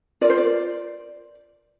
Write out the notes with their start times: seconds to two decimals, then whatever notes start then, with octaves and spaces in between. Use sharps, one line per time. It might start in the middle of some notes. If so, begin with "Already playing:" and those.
0.21 F4 A#4 D5
0.30 C5
0.38 D5